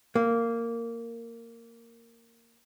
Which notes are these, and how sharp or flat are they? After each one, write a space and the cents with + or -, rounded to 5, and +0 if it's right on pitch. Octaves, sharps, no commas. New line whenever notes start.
A#3 -10